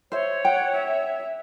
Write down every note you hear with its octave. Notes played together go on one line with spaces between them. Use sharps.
C5 C#5 E5
F#5 G5
E5